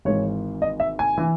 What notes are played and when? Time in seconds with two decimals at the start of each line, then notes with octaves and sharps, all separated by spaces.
0.05 G#1 G#2 E3 C#5
0.62 D#5
0.80 E5
0.99 G#5
1.18 E3